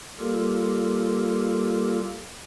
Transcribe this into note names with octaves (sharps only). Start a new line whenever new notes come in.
G3 A#3 F4 G4 A4 A#4